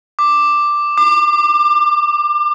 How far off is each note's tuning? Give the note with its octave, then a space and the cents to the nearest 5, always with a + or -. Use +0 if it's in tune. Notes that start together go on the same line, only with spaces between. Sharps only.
D6 +5
D6 +35